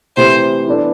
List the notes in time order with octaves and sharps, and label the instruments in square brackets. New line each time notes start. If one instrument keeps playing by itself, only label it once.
[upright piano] C3 E3 A3 E4 G4 [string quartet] C5
[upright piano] E3 B3 D4 A4